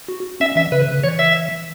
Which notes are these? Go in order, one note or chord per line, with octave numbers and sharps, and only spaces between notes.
F#4
C#4 E5
E3 E5
C#3 B4
C#3
E3 C#5
E5